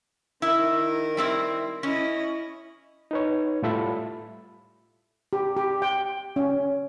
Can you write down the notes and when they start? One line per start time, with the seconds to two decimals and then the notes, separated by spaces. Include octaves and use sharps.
0.42 D#3 E4 A#4
1.17 G3 C4 E4
1.83 C#4 E4 D#5
3.11 D#4 B4 C#5
3.63 A2 G3 F4 A4 E5 B5
5.33 G4
5.57 G4
5.82 G5
6.36 C#4